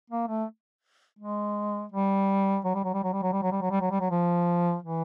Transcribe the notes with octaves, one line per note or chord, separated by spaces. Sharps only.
A#3
A3
G#3
G3
F#3
G3
F#3
G3
F#3
G3
F#3
G3
F#3
G3
F#3
G3
F#3
G3
F#3
F3
E3